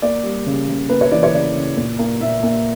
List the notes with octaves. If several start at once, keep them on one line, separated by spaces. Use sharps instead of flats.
A#3 D5
G3
C#3
C#3
A#3 B4
C#5
E3 D5
C#5
C#3 D5
C#3
A#2
A#3
A#2 E5
A#3